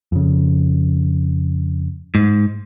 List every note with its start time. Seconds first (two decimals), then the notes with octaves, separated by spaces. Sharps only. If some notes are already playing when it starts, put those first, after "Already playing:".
0.12 F2 C#3
2.15 G#2